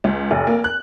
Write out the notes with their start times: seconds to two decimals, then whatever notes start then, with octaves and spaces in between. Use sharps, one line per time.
0.04 C#2
0.31 F1
0.47 A#3
0.64 F#6